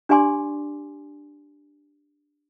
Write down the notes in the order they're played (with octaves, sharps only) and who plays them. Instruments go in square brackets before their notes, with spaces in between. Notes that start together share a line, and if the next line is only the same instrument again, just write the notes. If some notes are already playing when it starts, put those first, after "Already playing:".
[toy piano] D4 G4 D5 G#5 C6 D6